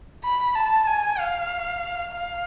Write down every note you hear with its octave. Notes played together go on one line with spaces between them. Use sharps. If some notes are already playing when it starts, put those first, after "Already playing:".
B5
A5
G#5
F5
F5